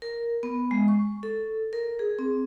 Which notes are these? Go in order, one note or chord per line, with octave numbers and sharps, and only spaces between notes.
A#4
B3
G#3
C#6
A4
A#4
G#4
C4